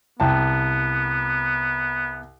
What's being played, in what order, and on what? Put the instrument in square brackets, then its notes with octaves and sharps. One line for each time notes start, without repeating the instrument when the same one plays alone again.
[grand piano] C2 G5 A5 [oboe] B3